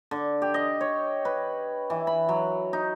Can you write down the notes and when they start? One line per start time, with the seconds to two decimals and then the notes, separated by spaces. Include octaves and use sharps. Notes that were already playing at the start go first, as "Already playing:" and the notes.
0.11 D3
0.42 G4
0.54 D#5
0.81 C#5
1.25 B4
1.90 E3
2.07 B5
2.29 F#3
2.73 D#4